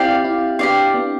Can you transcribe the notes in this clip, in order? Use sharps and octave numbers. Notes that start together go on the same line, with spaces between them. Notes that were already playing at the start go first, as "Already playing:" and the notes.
Already playing: C4 E4 G4 D5 F5
C4 E4
B3 D4 G4 D5 F5
B3 D4